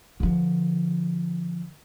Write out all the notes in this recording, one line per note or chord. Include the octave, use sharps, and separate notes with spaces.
D3 F3